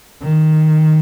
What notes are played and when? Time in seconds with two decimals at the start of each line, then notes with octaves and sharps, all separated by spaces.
0.22 D#3